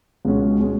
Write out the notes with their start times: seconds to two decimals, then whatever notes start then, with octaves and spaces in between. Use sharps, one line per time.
0.25 C#2 B2 G#3 C#4
0.59 B2 G#3 C#4